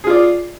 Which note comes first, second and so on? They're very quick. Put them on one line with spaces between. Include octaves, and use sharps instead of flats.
G#4 F4 D5